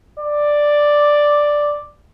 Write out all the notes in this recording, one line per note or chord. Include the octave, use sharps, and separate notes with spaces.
D5